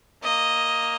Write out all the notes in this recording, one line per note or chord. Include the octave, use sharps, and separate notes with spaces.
A#3 D#5